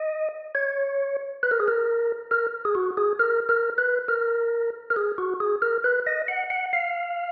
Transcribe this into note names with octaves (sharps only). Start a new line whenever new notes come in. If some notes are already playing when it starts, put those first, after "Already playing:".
Already playing: D#5
C#5
B4
A#4
G#4
A#4
A#4
G#4
F#4
G#4
A#4
A#4
B4
A#4
A#4
G#4
F#4
G#4
A#4
B4
D#5
F#5
F#5
F5